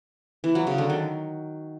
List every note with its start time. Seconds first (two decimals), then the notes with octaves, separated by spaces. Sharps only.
0.44 E3
0.55 F#3
0.67 C#3
0.78 D3
0.90 D#3